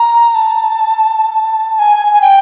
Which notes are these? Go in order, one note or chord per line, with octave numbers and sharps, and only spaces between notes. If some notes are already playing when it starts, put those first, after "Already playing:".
Already playing: A#5
A5
A5
G#5
G#5
G5